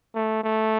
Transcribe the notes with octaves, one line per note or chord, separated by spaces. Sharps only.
A3
A3